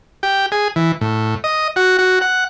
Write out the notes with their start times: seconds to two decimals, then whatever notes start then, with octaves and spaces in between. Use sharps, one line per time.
0.23 G4
0.52 G#4
0.76 E3
1.01 A2
1.44 D#5
1.76 F#4
1.99 F#4
2.21 F#5